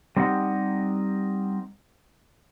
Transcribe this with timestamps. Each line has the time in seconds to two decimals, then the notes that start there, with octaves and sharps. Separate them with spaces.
0.16 G3 C4 D#4 G4 F#5